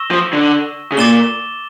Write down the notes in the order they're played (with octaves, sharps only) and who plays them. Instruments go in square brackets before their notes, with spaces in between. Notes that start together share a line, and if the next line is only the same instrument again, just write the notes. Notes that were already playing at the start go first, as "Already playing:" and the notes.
Already playing: [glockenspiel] C#6 E6 A#6 E7 G7
[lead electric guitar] F3
D3
C#3
[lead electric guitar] A#2 [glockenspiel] D6 A6 E7 G7